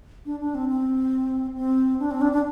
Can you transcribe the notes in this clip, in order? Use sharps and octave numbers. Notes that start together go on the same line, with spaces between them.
D4
D4
C4
C4
C4
D4
C4
D4
D4